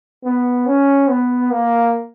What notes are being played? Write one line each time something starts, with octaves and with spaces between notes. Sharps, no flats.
B3
C#4
B3
A#3